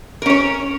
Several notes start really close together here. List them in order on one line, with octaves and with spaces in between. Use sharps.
A#4 C#4 C#5